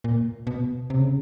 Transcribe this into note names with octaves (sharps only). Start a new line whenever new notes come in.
A#2
B2
C3
C#3